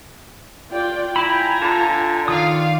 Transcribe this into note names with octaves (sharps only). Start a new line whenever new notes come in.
F4 D5 G5
E4 F4 G5 G#5 A#5 B5
D3 A5
D#3 F4 D5 F5 D#6